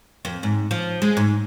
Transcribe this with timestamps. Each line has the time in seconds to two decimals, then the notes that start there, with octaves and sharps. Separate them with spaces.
0.25 F2
0.43 G#2
0.71 F3
1.02 G#3
1.17 G#2